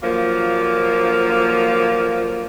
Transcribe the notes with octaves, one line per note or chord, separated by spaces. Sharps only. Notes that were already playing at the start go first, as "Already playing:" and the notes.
D3 F3 F#3 A#3